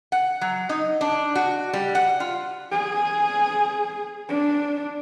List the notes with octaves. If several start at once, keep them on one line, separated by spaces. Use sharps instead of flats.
F#5
F#3
D#4
D4
F#4
G3
F#5
F4
G#4
D4